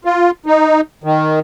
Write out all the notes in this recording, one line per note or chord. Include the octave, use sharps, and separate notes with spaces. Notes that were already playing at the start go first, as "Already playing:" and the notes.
F4
D#4
D#3